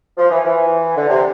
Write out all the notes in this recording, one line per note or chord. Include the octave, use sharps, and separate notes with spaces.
F3
E3
E3
D3
C3